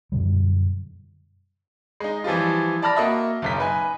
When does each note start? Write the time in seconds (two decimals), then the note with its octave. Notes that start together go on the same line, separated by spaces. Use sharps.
0.12 F#2 B2 D3 G3
2.00 G#3 D#4
2.24 E3 F3 G3 F4
2.82 D5 A5 B5 F6 A#6
2.96 A#3 F#4 D#5 E5
3.42 F#1 B1 B6
3.58 D#4 B4 G#5